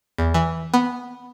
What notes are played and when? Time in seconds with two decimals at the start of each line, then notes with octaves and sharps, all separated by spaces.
0.18 E2
0.34 E3
0.74 B3